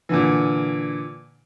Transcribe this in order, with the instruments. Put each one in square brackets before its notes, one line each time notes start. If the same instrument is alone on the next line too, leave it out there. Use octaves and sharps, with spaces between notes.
[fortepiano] A#2 D3 E3